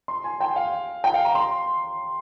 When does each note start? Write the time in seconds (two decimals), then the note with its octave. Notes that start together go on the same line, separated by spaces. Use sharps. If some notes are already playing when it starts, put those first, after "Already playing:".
0.08 C6
0.24 G#5
0.40 G5
0.56 F5
1.04 G5
1.14 F5
1.25 A#5
1.35 C6